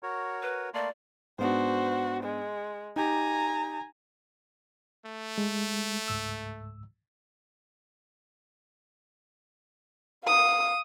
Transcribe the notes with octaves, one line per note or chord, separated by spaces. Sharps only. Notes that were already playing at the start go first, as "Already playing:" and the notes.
F#4 A#4 C#5
B4
A3 A#3 D5 C6
G#2 B3 D4 F#4 C5
G#3
D#4 G4 G#5 A#5
A3
G#3
C#2 G#2 E6
F5 D#6